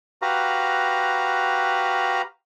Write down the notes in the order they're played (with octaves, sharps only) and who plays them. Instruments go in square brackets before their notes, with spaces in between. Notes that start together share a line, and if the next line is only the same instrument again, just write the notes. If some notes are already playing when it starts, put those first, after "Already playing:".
[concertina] F#4 G4 B4 F5 A#5